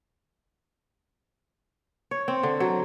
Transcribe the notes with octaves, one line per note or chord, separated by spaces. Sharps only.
C#5
C4
D3
F#3